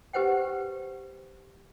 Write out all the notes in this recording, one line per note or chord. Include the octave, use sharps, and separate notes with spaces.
G4 B4 C5 F#5 G5